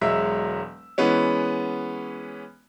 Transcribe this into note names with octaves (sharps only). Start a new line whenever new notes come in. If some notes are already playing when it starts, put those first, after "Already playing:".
E1 F#3 G#3 E5 E6
E3 G#3 B3 C#4